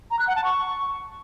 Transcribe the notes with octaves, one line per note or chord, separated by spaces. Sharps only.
A#5
F#6
F#5
A5
C#6